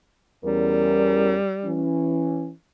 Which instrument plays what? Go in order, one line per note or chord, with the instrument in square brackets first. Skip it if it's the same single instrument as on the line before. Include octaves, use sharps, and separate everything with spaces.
[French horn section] E2 C#4 A#4 [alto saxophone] G3
[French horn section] E3 C#4